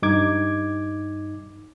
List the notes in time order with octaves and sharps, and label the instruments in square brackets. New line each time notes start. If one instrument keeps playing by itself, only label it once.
[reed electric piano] G2 D#4 D6 G#6